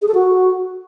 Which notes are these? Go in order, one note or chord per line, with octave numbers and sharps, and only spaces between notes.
G#4
A4
F#4